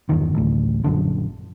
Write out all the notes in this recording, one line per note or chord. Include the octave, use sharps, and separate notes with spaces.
G1 E2 D#3
A1 D2
A#1 F#2 D3